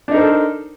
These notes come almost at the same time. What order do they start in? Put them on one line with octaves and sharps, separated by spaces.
D4 D#4 A#4 C5 A4